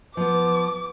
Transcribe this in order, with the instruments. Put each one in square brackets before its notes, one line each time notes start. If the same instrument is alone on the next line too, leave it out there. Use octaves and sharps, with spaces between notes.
[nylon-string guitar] F3 B3 [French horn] B4 [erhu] D6